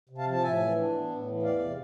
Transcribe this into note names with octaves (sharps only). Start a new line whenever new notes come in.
C3
F5 A5
F3
A5
A2 E5 G#5
E3
D4
B3
A2
E3
E2 D5 F5
C3